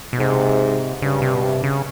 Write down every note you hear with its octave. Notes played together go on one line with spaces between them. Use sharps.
B2
G#2 C3
G2 C#3
C3
B2
C3
C#3